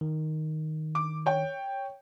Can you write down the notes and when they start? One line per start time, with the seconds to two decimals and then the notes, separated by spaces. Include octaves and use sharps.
0.01 D#3
0.95 D6
1.26 C#5 G5